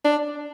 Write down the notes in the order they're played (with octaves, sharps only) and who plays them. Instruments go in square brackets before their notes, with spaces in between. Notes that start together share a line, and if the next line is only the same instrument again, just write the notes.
[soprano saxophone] D4